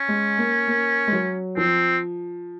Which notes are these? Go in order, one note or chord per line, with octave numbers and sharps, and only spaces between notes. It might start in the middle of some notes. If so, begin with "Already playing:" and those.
Already playing: C#4
G#3
A#3
A#3
G#3
F#3
F3 C4